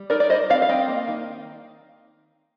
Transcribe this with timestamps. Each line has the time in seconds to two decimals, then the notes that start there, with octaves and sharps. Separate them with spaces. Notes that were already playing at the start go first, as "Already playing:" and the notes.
Already playing: G3
0.10 D#4 A#4 D5
0.20 D5
0.30 G3 C5 D#5
0.50 C4 D5 F5
0.62 F5
0.69 C4 D#5 G5
0.88 A#3
1.08 D#3